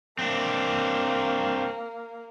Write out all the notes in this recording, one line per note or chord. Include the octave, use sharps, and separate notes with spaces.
A#3 C4 D4